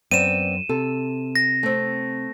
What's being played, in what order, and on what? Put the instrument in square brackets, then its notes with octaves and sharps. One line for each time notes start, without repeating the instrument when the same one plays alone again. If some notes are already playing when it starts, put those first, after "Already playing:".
[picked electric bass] F#2 [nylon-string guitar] B3 C4 D5 [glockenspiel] D#7 E7
[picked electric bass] C3 [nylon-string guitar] A4
[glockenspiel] A#6
[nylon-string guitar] A3 C4